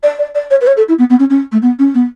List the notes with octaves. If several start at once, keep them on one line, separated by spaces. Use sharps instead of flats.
D5
D5
D5
C#5
B4
C#5
A4
E4
B3
B3
C#4
C#4
A3
B3
C#4
B3